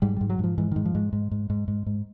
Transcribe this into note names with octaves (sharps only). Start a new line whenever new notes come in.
G#2 G3
G#2 G3
F#3
G#2 F3
G#2 E3
G#2 D#3
F3
G#2
G#2
G#2
G#2
G#2
G#2